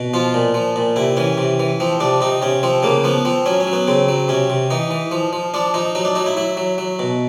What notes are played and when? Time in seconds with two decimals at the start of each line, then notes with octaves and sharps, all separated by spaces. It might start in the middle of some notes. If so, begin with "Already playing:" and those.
Already playing: B2
0.14 F3 F4
0.34 A#2
0.54 F3
0.76 A#2
0.96 C3 E4
1.17 E3 C#4
1.38 C3
1.59 E3
1.80 F3 C4
2.00 C3 D4
2.21 C3 D#4
2.42 C3 C#4
2.63 F3 C4
2.83 C#3 A#3
3.04 F3 B3
3.25 F3 C4
3.46 F#3 C#4
3.60 C#4
3.67 F#3
3.73 B3
3.88 C#3 C4
4.09 F#3
4.28 C3 C#4
4.50 C3
4.70 E3 D#4
4.91 E3
5.11 F3
5.33 F3
5.54 F3 D4
5.74 F3 D#4
5.95 F#3 D#4
6.05 D4
6.15 F#3 D#4
6.26 E4
6.37 F#3 E4
6.57 F#3
6.78 F#3
6.99 B2